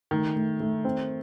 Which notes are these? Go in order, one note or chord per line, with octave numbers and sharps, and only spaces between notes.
D#3 A3
A3
A3
C4